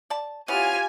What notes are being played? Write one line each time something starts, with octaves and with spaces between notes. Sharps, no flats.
D5 A5
B3 C#4 E4 F4 G4 G#5 F6 D#7